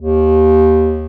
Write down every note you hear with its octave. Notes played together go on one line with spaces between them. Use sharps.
D#2